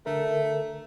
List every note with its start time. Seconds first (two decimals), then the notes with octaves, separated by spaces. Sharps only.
0.06 D3 A3 A#4